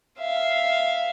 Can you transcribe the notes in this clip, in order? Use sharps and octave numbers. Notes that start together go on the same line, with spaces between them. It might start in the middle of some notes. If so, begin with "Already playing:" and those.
E5 F5